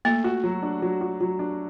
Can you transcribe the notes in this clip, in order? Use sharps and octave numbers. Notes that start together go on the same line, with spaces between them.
A3 A#3
F#4
F#3
D4
F#3
F#4
F#3
D4